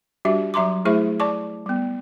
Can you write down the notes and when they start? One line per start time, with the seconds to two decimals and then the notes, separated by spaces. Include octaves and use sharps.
0.25 G3 D4 F#4 G4 E5
0.54 F#3 E5 A#5 C6 D6
0.85 A3 E4 G#4 C5 E5 C#6
1.20 D5 A5 C#6 D6
1.66 G3 B3